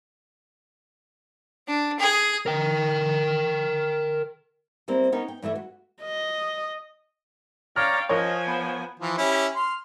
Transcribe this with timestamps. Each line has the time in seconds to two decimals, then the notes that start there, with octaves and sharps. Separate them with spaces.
1.67 D4
1.99 G#4
2.46 A#4 G5
4.88 G3 A#3 C4 E4
5.12 B3 C#4 D#4 A#4
5.28 G5
5.42 G2 E3 A3 E5
5.55 F#4
6.03 D#5
7.76 C#5 D5 F5 G5 A#5 F6
8.09 F3 A#4 C#5 D#5 G#5
8.47 B3
9.00 E3 F3
9.18 C#4 E4 G4
9.55 C6 F6